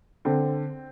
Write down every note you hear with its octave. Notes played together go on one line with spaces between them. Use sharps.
D3 C4